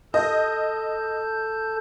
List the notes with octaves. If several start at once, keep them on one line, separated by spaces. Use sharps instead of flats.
A4 D#5 A5 G6